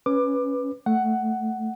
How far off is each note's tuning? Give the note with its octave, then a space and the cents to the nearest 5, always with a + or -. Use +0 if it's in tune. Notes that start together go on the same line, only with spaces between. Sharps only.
C#4 +0 B4 +0 D6 +20
A3 +0 F#5 +10